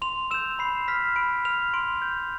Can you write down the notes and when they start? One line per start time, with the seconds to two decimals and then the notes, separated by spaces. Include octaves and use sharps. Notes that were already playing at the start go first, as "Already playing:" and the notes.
0.02 C6 F7
0.31 E6 G6 E7
0.59 B5 C7
0.88 F6 B6
1.16 B5 D7
1.45 F6 F7
1.73 C6 D7
2.02 G6